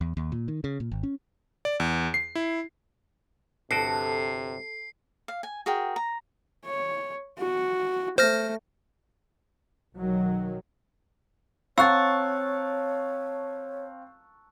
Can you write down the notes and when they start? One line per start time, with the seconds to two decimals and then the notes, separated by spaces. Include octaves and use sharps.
0.01 E2
0.17 D#2
0.32 A#2
0.48 D#3
0.64 C#3
0.80 A#2
0.91 G#1
1.03 C#4
1.65 D5
1.80 E2
2.14 C7
2.35 E4
3.71 G1 C3 F#4 A4 G5 C7
5.28 F5
5.43 G#5
5.66 F#4 G#4 A#4 G5
5.96 A#5
6.66 C#5
7.38 F#4
8.18 A3 C5 F6 A#6
9.95 B1 D#3 F#3
11.78 C4 C#5 F5 A5 C#6 E6 F#6